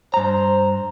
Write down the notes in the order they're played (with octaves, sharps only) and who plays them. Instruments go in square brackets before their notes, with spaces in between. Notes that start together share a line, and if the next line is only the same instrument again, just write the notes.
[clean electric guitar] G2 A#5 [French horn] C5